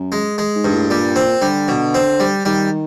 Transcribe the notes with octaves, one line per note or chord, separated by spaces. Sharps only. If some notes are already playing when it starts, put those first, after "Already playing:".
Already playing: F#2
G#3
G#3
G#2
G2
A2
A#2 G3
C4
D3 G3
B2
C4
G3
D#3 G3